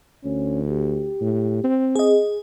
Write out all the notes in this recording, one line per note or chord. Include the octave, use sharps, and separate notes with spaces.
D2 C#4
G4
A2
C4
G#4 D#5